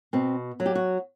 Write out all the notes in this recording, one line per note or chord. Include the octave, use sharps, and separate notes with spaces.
B2 C4
F#3
G4
F#4